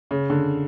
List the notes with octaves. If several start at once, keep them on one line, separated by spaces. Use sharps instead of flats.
C#3
D3